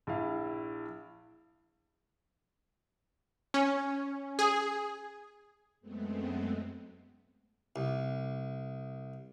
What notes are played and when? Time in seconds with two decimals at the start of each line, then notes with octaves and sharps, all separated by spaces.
0.07 A#1 E4 F5
3.54 C#4
4.39 G#4
5.81 F#2 G#3 A3 B3 C4
7.76 C2